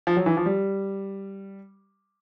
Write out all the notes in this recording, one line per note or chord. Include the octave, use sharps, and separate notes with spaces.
F3
F#3
E3
F3
G3